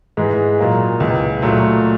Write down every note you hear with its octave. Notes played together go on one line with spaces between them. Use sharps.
G#2 E3 G#3
A#2 F#3 A#3
C#2 C#3 E3
A#2 F#3 A3